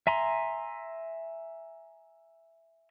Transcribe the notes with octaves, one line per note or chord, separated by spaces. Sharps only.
E5 G#5 A#5 C6